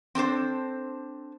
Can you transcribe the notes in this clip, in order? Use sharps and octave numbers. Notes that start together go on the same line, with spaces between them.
C4 D4 A4 C5